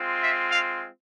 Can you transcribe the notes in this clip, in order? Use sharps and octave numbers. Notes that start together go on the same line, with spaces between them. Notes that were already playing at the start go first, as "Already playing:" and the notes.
Already playing: G#3 C4 F4
E5
F5